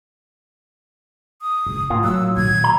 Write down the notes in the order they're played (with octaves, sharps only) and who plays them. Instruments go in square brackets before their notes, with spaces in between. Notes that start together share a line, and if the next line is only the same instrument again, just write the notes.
[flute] D#6
[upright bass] C#3 D#4
[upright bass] A2 [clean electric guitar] A#3 F4
[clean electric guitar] F#3 [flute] E6
[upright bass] A#2 D#3 [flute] G#6
[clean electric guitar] A#5